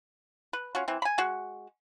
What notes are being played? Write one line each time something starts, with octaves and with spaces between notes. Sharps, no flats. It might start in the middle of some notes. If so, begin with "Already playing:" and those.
B4
C#4 F4 F#4
E3 C4
G#5 B5
G#3 F#4